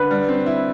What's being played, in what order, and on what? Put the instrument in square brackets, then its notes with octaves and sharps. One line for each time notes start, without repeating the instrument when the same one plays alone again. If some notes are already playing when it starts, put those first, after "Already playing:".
Already playing: [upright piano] D3 [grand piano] B4
[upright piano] G3
C4
E4